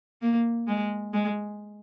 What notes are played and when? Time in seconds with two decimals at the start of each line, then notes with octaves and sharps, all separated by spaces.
0.22 A#3
0.68 G#3
1.13 G#3